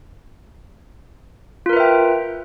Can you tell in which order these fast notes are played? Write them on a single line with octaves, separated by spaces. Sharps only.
F4 A#4 B4 E5 G5